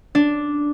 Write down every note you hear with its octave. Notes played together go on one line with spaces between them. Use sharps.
D4